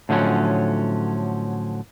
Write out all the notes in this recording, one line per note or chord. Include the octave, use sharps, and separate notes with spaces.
A2 D3 F3 F#3 C#4